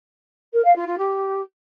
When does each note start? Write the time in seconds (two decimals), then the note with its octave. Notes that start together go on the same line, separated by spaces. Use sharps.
0.53 A#4
0.64 F5
0.75 F4
0.86 F4
0.97 G4